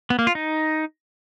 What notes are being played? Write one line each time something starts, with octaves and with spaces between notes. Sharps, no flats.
B3
A#3
F4
D#4